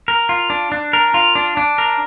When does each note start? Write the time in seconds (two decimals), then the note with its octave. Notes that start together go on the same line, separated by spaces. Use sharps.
0.08 A#4
0.29 F4
0.50 D4
0.72 D4
0.93 A#4
1.14 F4
1.35 D4
1.57 D4
1.78 A#4